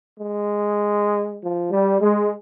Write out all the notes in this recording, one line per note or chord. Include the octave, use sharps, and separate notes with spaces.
G#3
F3
G3
G#3